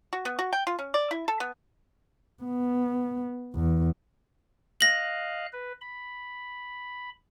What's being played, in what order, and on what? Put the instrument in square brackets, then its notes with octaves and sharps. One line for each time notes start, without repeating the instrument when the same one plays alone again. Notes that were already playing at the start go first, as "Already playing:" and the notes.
[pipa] F#4
B3
F#4
G5
F4
C#4
D5
E4
A4
B3
[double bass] B3
E2
[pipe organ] D#5 F5 F#6 [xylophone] A#6 F#7
[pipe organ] B4
B5